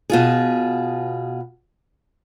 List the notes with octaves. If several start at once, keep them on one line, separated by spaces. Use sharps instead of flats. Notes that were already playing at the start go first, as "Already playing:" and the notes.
B2 F4 G#4